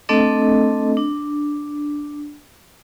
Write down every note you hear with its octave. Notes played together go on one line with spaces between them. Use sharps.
A3 C4 D4 A4 D#5
D4